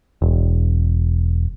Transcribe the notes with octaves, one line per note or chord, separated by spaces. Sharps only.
E1